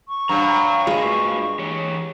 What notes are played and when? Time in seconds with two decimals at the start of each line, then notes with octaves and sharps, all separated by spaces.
0.08 C#6
0.29 G2 C#5 F#5 A#5
0.87 G#3 F4 F#4 B4
1.59 E3 G4 C#5